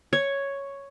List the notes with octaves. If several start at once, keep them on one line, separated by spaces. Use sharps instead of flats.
C#5